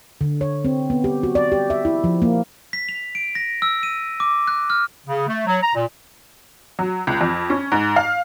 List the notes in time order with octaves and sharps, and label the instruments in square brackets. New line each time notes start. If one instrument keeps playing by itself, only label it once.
[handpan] D3
C#5
C4
B3
G4
F#4
D5
G4
E5
E4
F3
A#3
[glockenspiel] B6
F7
D7
A#6
E6
D#7
D6
F#6
F6
[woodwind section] C#3
A3
F#3
A#5
A#2
[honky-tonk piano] F#3
C#2
F2
C#4
G#2
F5